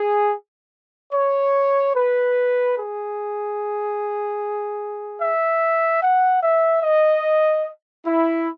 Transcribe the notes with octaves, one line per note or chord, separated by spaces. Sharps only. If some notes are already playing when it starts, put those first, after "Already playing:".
Already playing: G#4
C#5
B4
G#4
E5
F#5
E5
D#5
E4